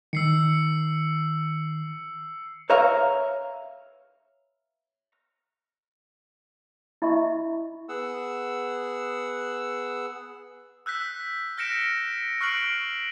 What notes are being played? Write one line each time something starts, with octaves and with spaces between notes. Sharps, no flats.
D#3 E6 C7 C#7
B4 C#5 E5 F5 A#5
E4 D#5 E5 B5 C#6
B3 G#4 F#5 E6
E6 F#6 G6 B6
F6 G6 A#6 C#7 D7 E7
C#6 F6 F#6 C7 D7 F#7